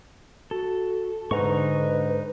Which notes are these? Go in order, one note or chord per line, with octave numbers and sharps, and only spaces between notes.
F#4 A4
G#2 D3 D#4 B4 A#5 C#6